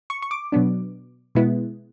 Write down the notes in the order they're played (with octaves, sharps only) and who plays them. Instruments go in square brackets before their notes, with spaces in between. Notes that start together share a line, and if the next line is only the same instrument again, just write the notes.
[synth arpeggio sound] C#6
C#6
D6
B2 F#3 B3 D4
B2 G#3 B3 E4